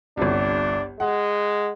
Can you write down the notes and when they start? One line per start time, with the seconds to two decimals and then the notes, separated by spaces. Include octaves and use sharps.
0.17 G1 C2 D4
1.00 G#3 F#5